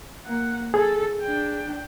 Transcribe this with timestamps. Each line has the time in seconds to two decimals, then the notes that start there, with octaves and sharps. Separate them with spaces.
0.25 A#3 F#5
0.74 G#4 A4
1.22 D4 G5